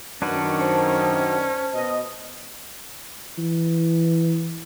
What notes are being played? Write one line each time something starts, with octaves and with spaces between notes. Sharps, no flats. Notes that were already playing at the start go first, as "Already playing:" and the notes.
F#2 D#3 C#4 D4 F#4 B4
C5 A5
B2 D#5
E3